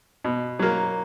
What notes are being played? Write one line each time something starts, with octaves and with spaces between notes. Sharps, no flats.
B2
F#3 A#3